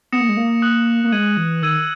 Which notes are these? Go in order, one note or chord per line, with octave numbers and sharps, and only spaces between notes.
B3 D#6 A#6 C#7 E7
A#3
G#3
A#3
D#6 F#6 C#7 F#7
A#3
G#3 G#6 D#7 F#7
E3
D#3 E6 G#6 D#7